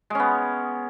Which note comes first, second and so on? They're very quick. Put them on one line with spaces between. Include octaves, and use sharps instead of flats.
G#3 C#4 B3